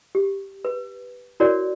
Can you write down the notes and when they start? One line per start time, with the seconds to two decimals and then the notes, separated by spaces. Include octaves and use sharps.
0.15 G4
0.65 B4
1.40 E4 F#4 A#4 C#5 D5